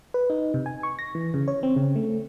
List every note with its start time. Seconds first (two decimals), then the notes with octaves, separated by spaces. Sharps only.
0.14 B4
0.30 D#4
0.54 C3
0.66 G#5
0.83 C#6
0.99 A#6
1.15 E3
1.34 C#3
1.48 C#5
1.63 C4
1.76 C#3
1.96 A3